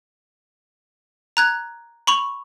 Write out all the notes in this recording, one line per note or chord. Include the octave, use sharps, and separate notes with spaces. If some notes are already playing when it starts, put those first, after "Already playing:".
A#5 F#6 G#6
B5 C#6 F7